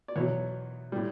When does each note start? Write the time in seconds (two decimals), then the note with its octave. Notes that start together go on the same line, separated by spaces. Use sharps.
0.08 D5
0.16 E2 B2 F#3 C#5
0.92 A2 G3